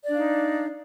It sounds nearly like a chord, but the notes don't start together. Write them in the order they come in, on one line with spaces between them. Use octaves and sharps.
D5 D4 F5 D#4